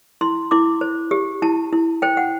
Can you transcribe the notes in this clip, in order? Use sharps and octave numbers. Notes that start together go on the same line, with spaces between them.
E4 C6
E4 D6
C5
G4
E4 A5
E4
C5 G5
F#5